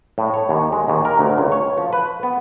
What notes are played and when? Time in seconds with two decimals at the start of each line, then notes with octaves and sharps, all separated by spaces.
0.18 A2
0.34 C#5
0.49 D#2
0.73 G#3
0.88 D#2
1.05 A#4
1.19 D2
1.38 C#2
1.52 C#5
1.78 F3
1.93 B4
2.23 B3